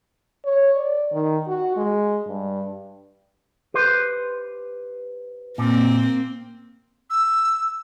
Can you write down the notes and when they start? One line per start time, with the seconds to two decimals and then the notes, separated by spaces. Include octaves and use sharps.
0.45 C#5
0.75 D5
1.12 D#3
1.47 F#4
1.76 G#3
2.27 G2
3.74 G4 B4 C5
5.58 A#2 A#3 C4
7.10 E6